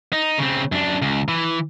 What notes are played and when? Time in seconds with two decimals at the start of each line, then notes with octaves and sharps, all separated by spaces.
0.13 D#4
0.38 C#3 C4
0.72 F#2 D4
1.02 C#2
1.28 E3